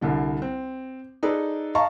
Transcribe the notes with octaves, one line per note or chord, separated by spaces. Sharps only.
C2 D3 G3
C4
D#4 G#4 A4 B4 D5
D#5 F5 A5 A#5 C#6